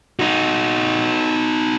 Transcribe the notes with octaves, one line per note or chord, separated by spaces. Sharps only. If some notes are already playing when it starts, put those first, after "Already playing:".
D#4 F#4